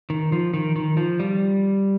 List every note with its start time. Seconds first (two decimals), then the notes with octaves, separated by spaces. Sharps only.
0.10 D#3
0.32 F3
0.54 D#3
0.76 D#3
0.97 F3
1.20 G3